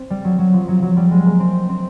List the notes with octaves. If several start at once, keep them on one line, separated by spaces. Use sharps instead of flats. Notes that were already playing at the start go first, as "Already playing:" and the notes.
Already playing: C4
G3
F#3
F#3
F3
F#3
F#3
G3
G#3
A#3
C4
C4